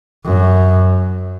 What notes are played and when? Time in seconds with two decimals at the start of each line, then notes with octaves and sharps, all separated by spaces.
0.25 F#2